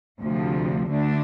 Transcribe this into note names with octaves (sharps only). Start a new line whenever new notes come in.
D2 C3 F3
D2 D3 A3 D4